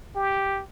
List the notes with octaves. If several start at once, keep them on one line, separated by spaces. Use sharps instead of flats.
G4